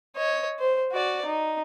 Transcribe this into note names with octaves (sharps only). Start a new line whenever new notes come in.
C#5 D#5
C5
F#4 D5
D#4